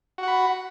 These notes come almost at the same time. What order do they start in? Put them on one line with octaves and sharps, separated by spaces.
F#4 F#5 B5